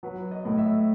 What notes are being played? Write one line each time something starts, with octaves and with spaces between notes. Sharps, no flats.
F#3 B4
D#5
A2
E5